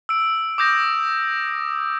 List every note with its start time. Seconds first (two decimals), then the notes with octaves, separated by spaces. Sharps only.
0.09 E6 D7
0.58 D6 D#6 G6 A#6